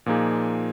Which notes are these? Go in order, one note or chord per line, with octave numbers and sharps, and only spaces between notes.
A#2 F3 A#3 D#4 G#4